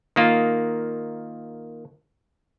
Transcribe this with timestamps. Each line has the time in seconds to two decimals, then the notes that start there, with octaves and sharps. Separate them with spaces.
0.16 D#3 A#3 F4